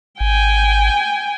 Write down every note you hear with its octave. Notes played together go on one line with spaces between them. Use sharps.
G#1 G5 G#5